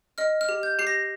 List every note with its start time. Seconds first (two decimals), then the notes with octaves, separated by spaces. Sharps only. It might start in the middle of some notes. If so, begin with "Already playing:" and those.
0.18 D#5 F6
0.41 F6
0.49 G4
0.63 G6
0.79 G4 C7
0.87 A#6